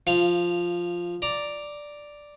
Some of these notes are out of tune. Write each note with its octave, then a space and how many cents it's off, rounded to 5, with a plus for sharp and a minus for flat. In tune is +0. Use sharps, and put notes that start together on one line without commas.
F3 +0 F5 -15
D5 +0 A#5 +0